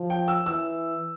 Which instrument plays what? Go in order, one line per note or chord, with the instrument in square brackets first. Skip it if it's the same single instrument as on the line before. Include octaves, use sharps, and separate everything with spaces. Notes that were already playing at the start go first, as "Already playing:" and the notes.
Already playing: [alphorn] F3
[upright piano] G5
E6
[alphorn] E3 [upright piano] E6